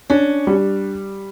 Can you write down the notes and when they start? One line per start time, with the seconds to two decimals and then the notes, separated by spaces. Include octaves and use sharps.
0.10 C#4 D4
0.47 G3